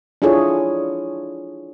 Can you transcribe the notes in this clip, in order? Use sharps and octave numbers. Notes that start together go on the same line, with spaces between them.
D4 E4 F4 G#4 A4 C#5